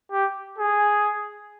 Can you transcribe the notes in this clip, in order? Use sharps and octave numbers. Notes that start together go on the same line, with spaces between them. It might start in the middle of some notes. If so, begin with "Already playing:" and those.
G4
G#4